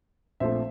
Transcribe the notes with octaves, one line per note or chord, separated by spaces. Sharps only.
A#1 A#2 F3 A3 C4 C5 E5